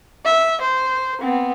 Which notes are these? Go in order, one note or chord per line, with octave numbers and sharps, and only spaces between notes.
E5
C5
B3 C4